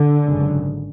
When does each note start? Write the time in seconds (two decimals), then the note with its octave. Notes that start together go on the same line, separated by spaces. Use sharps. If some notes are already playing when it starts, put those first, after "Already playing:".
Already playing: D3
0.26 G#1 F#2 C#3